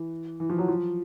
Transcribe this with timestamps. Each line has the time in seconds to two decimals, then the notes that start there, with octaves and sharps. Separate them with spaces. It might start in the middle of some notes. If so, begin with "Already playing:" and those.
Already playing: E3
0.40 E3
0.50 F3
0.58 F#3
0.68 F3